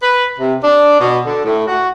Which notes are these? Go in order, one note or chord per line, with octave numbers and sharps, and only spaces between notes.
B4
C3
D4
B2
D3
A2
F#4